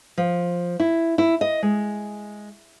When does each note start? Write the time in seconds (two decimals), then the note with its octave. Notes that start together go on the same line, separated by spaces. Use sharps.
0.18 F3
0.80 E4
1.18 E4
1.41 D#5
1.63 G#3